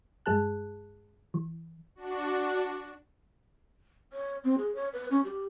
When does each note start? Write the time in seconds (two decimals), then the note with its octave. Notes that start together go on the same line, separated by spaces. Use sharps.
0.26 G2 G#3 G#4 A5 F#6
1.34 E3
1.95 D4 F#4
4.13 C#5
4.44 C4
4.58 G#4
4.75 C#5
4.93 B4
5.11 C#4
5.24 G4